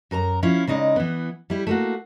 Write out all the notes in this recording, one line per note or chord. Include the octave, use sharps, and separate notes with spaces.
F#2 A#4 A5 A#5
F3 C#4 E4 F4
C#3 G#3 D#4 D5
E3 B3
G3 E4 G4
A3 A#3 F#4